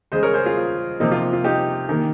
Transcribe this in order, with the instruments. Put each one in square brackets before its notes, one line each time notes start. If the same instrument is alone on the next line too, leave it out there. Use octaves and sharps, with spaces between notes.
[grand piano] C#3 G#3 C5 D#5
A#4 C#5
G#4 C5
F4 G#4
F4
C3 F3 A#3 D#4
F4
F4
D#4 G4
D#3 A#3